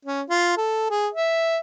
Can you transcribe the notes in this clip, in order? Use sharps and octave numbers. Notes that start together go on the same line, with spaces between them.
C#4
F4
A4
G#4
E5